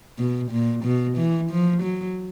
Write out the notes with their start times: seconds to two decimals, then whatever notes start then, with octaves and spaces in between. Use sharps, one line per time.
0.18 B2
0.51 A#2
0.84 B2
1.17 E3
1.50 F3
1.82 F#3